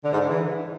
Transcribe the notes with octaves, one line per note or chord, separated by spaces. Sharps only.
D3
G#2
D3
E3